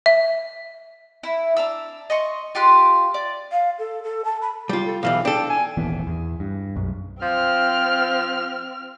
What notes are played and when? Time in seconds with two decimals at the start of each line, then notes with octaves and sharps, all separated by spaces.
0.06 E5
1.23 E4
1.56 D4 A#5 E6
2.10 D#5 C6 C#6
2.55 F4 G4 C6 F#6
3.14 D5
3.51 F5
3.79 A4
4.03 A4
4.25 A5
4.42 B5
4.69 G3 F4
4.86 A4
5.03 B1 E3 G3 F5
5.25 D4 A4 G5
5.50 G#5
5.77 D#1 G#1 E3 B3
6.07 E2
6.40 G2
6.76 B1 F#2
7.22 F3 C4 F6